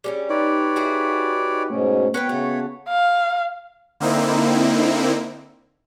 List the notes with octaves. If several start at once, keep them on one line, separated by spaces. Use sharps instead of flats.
G3 B3 C#4 G#4
D#4 G4 B4 C#5 D5
E4 F#4 G#4
G#2 B2 A3 C#4
B3 F#4 B4 C#5 G5
C#3 A3 F#4
F5
D3 A#3 C4 D#4 E4